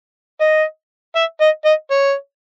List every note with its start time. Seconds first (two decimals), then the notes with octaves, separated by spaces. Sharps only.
0.40 D#5
1.16 E5
1.41 D#5
1.65 D#5
1.91 C#5